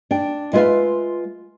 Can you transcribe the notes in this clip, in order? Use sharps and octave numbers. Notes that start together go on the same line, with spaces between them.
D4 G5
G#3 E4 F4 B4 E5 F5